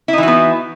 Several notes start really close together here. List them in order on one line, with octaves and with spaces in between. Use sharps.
E4 D#4 E3 F#4 B3